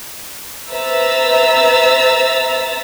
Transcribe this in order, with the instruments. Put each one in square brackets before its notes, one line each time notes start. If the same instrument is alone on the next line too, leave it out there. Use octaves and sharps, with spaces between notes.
[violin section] B4 C5 E5 A#5 E6 A6